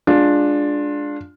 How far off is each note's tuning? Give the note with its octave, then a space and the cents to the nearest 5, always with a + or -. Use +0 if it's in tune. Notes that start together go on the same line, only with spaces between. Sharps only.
G#3 +0 D4 +0 F4 +15